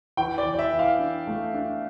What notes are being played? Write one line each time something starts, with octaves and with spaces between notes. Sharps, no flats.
E3 G5
D5
E3
D5
E5
E3
F5
D4
A3
D4